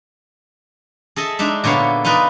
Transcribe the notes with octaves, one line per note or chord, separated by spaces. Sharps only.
G#4 A4 D#5 E5
G#3 D4 D#4 E5
A#2 D3 B3 C#5 F5
D#4 F4 G#4 B4 D5 D#5